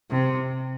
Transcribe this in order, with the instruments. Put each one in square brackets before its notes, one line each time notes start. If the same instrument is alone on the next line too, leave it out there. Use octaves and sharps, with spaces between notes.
[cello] C3